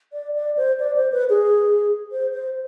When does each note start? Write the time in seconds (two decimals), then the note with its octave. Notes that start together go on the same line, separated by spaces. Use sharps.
0.13 D5
0.35 D5
0.57 C5
0.79 D5
0.96 C5
1.12 B4
1.29 G#4
2.11 C5
2.33 C5